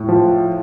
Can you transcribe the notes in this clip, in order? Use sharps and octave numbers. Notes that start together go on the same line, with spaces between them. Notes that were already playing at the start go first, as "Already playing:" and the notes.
Already playing: A2
F3